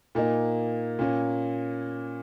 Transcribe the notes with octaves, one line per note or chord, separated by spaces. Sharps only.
A#2 A#3 D#4
A#2 A#3 C#4